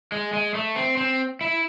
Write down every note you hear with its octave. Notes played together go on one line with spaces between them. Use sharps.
G#3
G#3
A3
C4
C4
E4